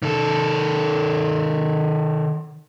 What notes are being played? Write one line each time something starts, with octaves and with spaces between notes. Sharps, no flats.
D#3 A4